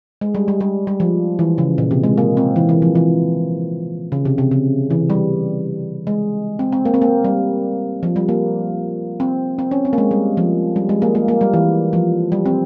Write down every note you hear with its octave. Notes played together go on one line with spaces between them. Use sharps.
G#3
G3
G3
G3
G3
F3
E3
C#3
A#2
C3
G#3
A#3
C4
E3
E3
F3
E3
C#3
C3
C3
C#3
E3
G3
G#3
C4
C4
A#3
C4
A#3
G3
F3
G3
A#3
C4
C4
C#4
C4
A#3
G#3
G3
F3
G3
G#3
A#3
A#3
A#3
G3
E3
F3
G3
C4